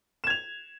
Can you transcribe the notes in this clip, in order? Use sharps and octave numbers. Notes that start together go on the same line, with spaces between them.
G#6 E7 F7